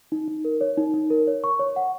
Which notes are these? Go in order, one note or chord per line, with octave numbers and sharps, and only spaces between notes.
D#4
D#4
A#4
C#5
D#4
D#4
A#4
C#5
C#6
C#5
F#5